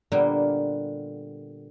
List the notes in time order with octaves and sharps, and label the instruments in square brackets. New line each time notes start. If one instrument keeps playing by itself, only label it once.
[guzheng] A#2 D3 G3 A#3 B3